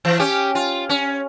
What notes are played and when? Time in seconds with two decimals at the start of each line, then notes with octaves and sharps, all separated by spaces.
0.05 E3
0.19 C#4 G4
0.55 F4
0.89 C#4